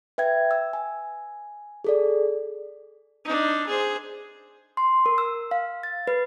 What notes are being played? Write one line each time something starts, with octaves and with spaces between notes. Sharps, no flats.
B4 E5 G5 G#6
E6
G#5
G#4 A4 D5
D4 D#4
G#4 C5
C6
A#4
E6
F5
A6
B4